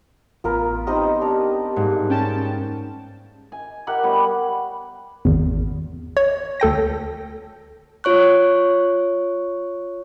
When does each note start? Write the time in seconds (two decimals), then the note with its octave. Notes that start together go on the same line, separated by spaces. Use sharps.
0.44 A1 B3 F4 A#4 B4
0.87 B3 C4 D#4 G4 D#5
1.21 D4 A#4
1.76 G#2 A#3 F#5
2.10 C#4 G5 A5
3.52 G#5
3.87 G4 A#4 F#5
4.03 G3 B3 C#5 D6
5.25 G#1 E2
6.17 C#5
6.60 D2 A4 G5 A#6
8.04 F4 C#5 C#6 F#6